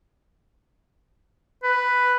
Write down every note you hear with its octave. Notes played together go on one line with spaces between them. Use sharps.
B4